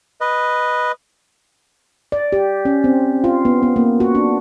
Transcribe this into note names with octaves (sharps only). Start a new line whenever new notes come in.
B4 D#5
D5
G4
C#4
C4
F4
B3
B3
A#3
F#4
D4